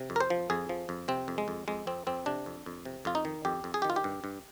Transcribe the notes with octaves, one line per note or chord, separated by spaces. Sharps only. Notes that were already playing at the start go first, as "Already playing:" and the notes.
Already playing: C3
F2
A#4
C5
F3
F2 G#4
F3
F2
C3 C4
F2
G#3
F2
F2 G#3
F2 C4
F2 C4
C3 D4
F2
F2
C3
F2 F4
D#4
D#3
F2 G4
F2
G#4
D#3 G4
F4
G4
G2
G2